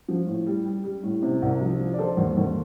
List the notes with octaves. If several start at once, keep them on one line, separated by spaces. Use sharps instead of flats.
F3
A2
G3
G3
G3
A2
C3
C2
F3
F3
D5
D#3 A4 C5
D#2
D#2